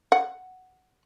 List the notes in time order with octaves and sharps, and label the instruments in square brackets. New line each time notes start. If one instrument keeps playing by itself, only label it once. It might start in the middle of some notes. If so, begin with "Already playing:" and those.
[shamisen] F#5